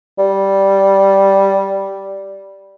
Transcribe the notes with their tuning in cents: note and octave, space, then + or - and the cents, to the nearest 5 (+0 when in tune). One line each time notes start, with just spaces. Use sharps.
G3 -5